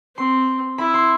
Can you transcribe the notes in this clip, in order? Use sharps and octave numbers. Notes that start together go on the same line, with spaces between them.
C4 C6
E4 B5
C6